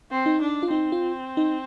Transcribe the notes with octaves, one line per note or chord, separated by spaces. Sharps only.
C4
D#4
D4
F4
C4 D#4
F4
D#4